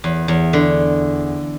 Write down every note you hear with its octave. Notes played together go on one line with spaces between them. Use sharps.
E2
E2
D3